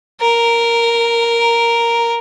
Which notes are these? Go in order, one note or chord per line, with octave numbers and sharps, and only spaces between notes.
A#4